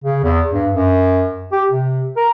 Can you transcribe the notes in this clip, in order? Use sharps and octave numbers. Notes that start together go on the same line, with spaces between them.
C#3
E2
G2
F#2
G4
C3
A#4